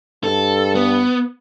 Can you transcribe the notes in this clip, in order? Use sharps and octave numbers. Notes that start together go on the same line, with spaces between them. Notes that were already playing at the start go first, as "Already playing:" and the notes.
G2 A4
B3